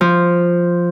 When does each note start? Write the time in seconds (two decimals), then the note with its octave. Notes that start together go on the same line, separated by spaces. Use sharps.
0.01 F3